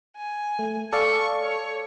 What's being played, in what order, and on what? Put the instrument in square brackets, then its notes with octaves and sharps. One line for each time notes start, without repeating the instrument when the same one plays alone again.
[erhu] G#5
[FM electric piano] A3
[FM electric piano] A4 D5 F5 [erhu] C#6
[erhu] C#5